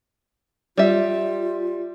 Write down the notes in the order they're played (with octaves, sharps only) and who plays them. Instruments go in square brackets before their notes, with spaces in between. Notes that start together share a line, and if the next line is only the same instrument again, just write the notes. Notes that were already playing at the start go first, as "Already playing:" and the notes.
[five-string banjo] G3 E5 [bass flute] F4